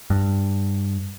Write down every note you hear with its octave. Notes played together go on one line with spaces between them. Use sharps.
G2